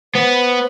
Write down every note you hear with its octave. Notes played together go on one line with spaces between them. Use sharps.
B3 C5